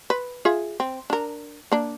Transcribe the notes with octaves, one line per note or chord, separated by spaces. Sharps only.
B4
F4 G#4 E5
C4
D4 A#4
A#3 D4